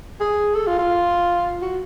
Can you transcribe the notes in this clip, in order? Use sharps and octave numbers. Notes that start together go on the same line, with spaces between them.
G#4
A4
F4
F4
F#4